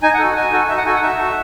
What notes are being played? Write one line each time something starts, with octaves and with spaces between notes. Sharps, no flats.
D#4 G#5
F#5
F#4 A4
D#4 G#5
F#4 A4
D#4 E5
F#5
F#4 A4 G#5
F#5
D#4 E5
F#4 A4